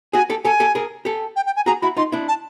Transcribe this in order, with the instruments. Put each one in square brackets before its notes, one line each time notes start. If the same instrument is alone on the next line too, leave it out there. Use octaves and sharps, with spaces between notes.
[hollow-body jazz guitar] F#4 G#4 [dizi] G#5
[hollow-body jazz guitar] G4 A4
[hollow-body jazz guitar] G4 A4 [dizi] G#5
[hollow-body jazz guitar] G4 A4
G#4 A#4
G4 A4
[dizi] G5
G5
G#5
[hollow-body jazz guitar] F#4 G#4 [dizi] A#5
[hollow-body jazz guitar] E4 F#4 [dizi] B5
[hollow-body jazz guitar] D#4 F4 [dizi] C6
[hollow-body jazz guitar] D4 E4
[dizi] A5